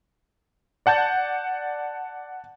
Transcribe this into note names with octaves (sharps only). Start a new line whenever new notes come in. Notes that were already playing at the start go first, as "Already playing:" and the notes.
D5 F#5 A5 G6 A6